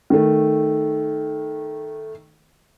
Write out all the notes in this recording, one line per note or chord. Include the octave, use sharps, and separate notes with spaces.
D#3 A3